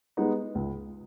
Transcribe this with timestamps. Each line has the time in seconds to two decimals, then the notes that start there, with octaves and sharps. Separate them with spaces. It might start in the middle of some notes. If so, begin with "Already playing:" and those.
0.17 G#3 B3 D#4 G4
0.55 C#2